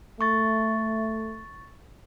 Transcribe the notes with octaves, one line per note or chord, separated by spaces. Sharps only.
A3 C#6 A6